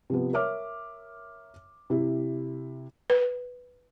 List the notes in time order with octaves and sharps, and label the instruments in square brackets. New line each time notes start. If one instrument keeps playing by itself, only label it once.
[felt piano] C3 F3 B3
A#4 C#5 E5 D6 F6
C3 E4
[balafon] B4